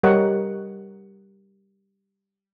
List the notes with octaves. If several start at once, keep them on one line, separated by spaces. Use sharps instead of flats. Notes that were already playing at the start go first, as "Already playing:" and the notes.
G3 A#4 C#5 D#5 F#5